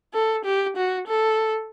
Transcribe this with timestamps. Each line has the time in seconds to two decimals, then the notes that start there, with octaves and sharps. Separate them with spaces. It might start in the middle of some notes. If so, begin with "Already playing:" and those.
0.14 A4
0.45 G4
0.76 F#4
1.07 A4